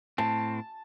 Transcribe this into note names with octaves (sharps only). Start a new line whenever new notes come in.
A2 C4 A5